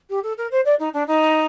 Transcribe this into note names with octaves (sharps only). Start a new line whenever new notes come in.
G4
A4
A#4
C5
D5
D#4
D4
D#4